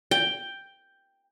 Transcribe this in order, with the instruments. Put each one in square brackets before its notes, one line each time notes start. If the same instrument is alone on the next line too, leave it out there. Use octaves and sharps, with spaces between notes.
[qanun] G5